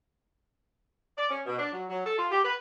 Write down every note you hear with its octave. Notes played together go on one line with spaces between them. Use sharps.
D5
C#4
B2
D4
F#3
F#3
A4
F4
G4
B4